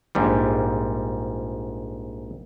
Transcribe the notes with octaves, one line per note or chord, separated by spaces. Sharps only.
A#1 G#2 G3